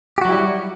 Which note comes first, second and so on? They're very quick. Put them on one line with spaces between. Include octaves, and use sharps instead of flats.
G4 F#4 F#3 E4 G3